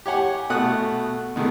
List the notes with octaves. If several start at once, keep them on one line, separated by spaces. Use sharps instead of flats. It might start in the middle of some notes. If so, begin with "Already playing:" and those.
G4 C#5 F#5 G#5
B2 A3 F#4 F#5 D#6 F#6
B2 D#3 G#3 A3